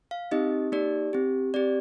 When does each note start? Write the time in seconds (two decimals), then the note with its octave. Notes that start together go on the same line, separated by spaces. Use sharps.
0.11 F5
0.31 C4 D#4 G4 D#5
0.72 A#3 D#4 G4 D5
1.13 C4 G4
1.54 C4 G4 D5